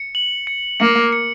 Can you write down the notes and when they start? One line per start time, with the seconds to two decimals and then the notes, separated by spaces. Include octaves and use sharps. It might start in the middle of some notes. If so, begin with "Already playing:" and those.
Already playing: C#7
0.15 F#7
0.47 C#7
0.80 A#3 C#7
1.12 C#7